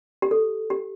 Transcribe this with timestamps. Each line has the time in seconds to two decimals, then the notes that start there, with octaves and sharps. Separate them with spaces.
0.22 G4
0.31 A4
0.70 G4